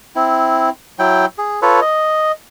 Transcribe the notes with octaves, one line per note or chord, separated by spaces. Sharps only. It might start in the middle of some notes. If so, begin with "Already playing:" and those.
C4 E4
F#3 E4 G5
G#4
F4 A4 B4 C#5
D#5